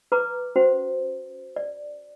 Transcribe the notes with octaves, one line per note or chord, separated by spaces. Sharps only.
B4 A#5 D6
C#4 F#4 C5
D5